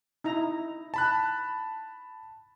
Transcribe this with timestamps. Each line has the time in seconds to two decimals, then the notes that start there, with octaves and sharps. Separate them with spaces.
0.24 D#4 E4 A#5
0.94 A5 B5 F#6